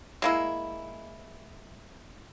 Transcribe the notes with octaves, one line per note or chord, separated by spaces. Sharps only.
G#3 A#3 E4